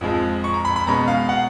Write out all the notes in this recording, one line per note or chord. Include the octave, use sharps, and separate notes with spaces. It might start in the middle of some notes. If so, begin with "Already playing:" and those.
F2 F3 G#3
C#6
A#5
B5
B5
B2 G#3 C#4 A#5
F5
F#5